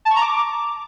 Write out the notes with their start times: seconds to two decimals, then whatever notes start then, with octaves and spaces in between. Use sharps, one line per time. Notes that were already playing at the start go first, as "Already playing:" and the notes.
0.05 A5
0.11 C#6
0.16 A#5
0.21 D6